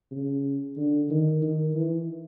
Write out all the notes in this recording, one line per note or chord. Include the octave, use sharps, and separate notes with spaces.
C#3
D3
D#3
D#3
E3